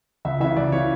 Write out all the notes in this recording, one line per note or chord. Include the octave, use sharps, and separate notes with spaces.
C#2 E5
C#3 E3 E5
C#2 D5
C#3 E3 C#5